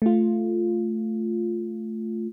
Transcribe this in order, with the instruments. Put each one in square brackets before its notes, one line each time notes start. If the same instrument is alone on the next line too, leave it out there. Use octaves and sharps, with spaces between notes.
[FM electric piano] A3 F4